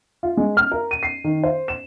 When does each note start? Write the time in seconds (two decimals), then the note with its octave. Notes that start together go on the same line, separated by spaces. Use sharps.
0.23 F4
0.37 G#3
0.57 F6
0.72 A#4
0.91 D#7
1.03 C7
1.24 D#3
1.44 C5
1.68 E7